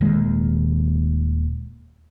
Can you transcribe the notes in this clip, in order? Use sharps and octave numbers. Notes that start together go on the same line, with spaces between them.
D#1 D#2 G#3